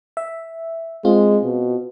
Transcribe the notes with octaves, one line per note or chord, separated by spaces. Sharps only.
E5
G#3 C4 F4
B2